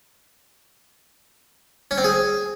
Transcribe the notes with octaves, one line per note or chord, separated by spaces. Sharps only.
C#4
C4
G#4